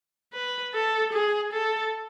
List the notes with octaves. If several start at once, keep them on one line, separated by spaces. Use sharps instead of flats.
B4
A4
G#4
A4